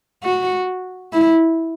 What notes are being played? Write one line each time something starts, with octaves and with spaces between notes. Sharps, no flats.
F#4
E4